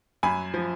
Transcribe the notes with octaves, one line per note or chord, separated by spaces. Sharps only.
F#2 G#5 B5
F3